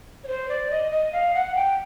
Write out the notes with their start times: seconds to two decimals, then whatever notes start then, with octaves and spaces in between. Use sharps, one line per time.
0.24 C#5
0.27 C5
0.49 D5
0.71 D#5
0.92 D#5
1.12 F5
1.35 F#5
1.56 G5